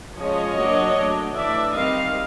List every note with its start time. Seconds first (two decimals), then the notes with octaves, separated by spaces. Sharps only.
0.18 F3 G#3 C#4 C#5 D#5
0.58 F#3 A#3 D4
0.97 F#3 A3 D4
1.36 E3 A3 D4 D5 E5
1.75 D#3 G3 C4 D#5 F5